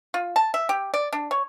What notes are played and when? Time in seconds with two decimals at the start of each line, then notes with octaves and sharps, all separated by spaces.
0.14 F4
0.36 A5
0.54 E5
0.69 G4
0.94 D5
1.13 D4
1.31 C#5